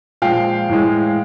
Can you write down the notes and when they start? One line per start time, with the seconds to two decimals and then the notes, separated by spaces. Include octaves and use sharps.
0.22 A#2 F3 G#3 F5 G5
0.69 A2 E3 G#3